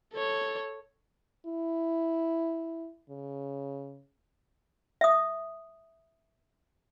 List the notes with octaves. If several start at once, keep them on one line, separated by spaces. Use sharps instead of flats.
A4 C#5
E4
C#3
E5 D#6